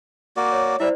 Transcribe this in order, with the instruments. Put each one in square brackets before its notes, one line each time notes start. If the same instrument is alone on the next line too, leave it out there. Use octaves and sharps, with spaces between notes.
[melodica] A#3 F#4 D5
[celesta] C#5
[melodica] G3 E5 [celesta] E4 C5 D5